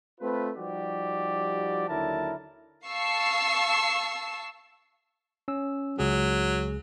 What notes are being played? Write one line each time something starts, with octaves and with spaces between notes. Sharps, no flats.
A3 C4 F4 B4
F3 G3 D#4 F#4 G4 D5
D#2 D3 F#3 E4 A#4 A5
F5 A5 C#6 E6 C7
C#4 E6
C#2 F#3 G#4